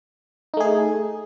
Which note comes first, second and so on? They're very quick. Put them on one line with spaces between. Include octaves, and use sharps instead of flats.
D#4 A3 G#4